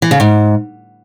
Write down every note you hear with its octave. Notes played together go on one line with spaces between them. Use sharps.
E3
C#3
G#2